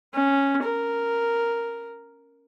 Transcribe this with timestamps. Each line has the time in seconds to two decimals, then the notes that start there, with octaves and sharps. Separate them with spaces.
0.14 C#4
0.64 A#4